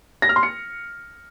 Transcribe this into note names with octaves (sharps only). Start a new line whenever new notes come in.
A#6
F6
C6
C#7